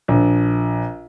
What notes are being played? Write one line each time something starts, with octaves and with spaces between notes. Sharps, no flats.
A#1